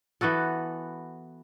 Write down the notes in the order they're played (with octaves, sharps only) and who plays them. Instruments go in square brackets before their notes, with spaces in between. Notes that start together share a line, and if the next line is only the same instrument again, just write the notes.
[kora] E3 B3 F#4 A4